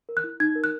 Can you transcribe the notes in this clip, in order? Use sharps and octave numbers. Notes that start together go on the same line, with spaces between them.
A#4
F#6
E4
D#4 G#6
A#4
F#6